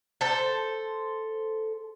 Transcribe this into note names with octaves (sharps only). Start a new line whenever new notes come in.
A4 C5